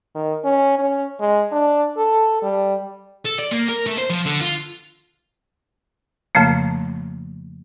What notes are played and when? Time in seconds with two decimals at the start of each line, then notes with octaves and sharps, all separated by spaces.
0.15 D#3
0.44 C#4
0.79 C#4
1.20 G#3
1.52 D4
1.97 A4
2.42 G3
3.26 A4
3.39 D5
3.52 A#3
3.69 A#4
3.87 A3
3.98 C5
4.10 F3
4.26 D3
4.41 F4
6.35 F2 C#3 F3 A3 A#3